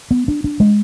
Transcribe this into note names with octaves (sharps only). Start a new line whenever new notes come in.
B3
D4
D4
G#3